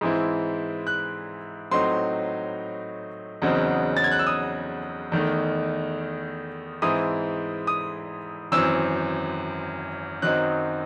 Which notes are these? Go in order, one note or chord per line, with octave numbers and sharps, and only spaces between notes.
G#2 E3 C4 E4
F#6
A2 F#3 C4 D#4 C6
E2 C#3 F#3 C4 D#4
A6
G#6
F#6
E6
D#6
E2 D#3 A3 D#4
G#2 E3 C4 E4 D#6
D#6
G#1 F#2 E3 C4 E6
F#2 D#3 F#3 C4 D#4 F#6